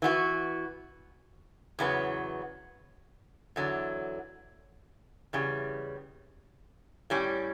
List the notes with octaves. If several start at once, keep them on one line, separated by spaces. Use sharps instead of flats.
E3 B3 F#4
E2 C#3 F#3 B3
E2 D3 F#3
E2 C#3 G3
A2 G3 C#4